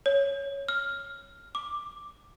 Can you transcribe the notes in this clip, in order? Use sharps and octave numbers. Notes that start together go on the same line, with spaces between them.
C#5
F6
D6